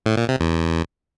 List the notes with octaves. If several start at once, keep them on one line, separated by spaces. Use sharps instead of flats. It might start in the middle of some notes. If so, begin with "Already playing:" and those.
A2
A#2
C3
E2